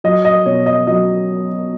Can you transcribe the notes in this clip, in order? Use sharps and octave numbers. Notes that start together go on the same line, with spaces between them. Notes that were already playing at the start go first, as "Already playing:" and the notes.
F#3 D#5
D#5
B2 C#5
D#5
F#3 D#5